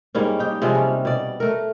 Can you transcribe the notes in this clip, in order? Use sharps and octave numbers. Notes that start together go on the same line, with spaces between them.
G#2 G3 A#3 C#4
D#4 G4
C3 F3 G#3 C#4
G3
B2 D5
A3 A#4